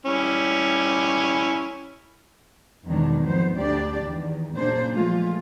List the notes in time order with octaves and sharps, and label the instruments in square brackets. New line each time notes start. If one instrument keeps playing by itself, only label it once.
[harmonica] G3 C#4 E4
[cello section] E2 B2 D#3 F#3 G#3 D4
F2 G#2 B3 C5
D2 D4 G4 D5
E2 D#3
A#2 C#3 F#3 A#3 D4 C5
E3 F3 G#3 A3 F4